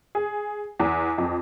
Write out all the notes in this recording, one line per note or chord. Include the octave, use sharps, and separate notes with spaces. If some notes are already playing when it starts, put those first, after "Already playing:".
G#4
E2
F2